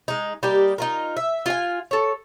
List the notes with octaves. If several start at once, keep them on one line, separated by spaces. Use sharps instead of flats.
G#3 D#4
G3 A#3 D#4 G4
D#4 F4 A#4
E5
F4 F5 G#5
A4 C#5